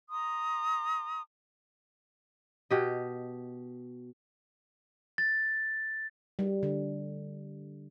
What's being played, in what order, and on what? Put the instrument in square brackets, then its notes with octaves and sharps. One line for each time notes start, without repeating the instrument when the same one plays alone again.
[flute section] A#5 C6 D#6
[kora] B2 G4 D#5
[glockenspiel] A6
[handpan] G3
D3